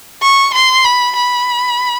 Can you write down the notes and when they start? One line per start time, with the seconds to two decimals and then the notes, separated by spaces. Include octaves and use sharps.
0.22 C#6
0.54 C6
0.84 B5
1.16 B5